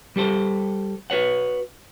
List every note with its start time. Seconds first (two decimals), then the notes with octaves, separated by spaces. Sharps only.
0.16 G3 G4 A4 C5
1.10 F#4 B4 C#5 F#5